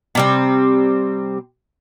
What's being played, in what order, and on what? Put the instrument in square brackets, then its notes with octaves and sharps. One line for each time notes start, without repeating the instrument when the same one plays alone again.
[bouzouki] C3 G3 C4